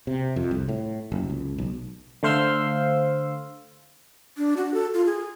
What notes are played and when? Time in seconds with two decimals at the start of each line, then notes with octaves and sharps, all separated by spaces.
0.07 C3
0.36 F2
0.51 C2
0.69 A2
1.12 F#1
1.30 C#2
1.58 B1
2.23 D3 A3 C5 F5 C6 E6
4.37 D4
4.57 F#4
4.74 A4
4.94 F4
5.06 G#4